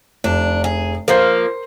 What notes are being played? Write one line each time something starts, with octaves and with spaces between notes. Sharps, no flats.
F1 D4
G#4
F3 A#3 A#4 C5